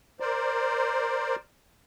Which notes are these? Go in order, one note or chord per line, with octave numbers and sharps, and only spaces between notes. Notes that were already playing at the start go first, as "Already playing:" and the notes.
A#4 C5 D5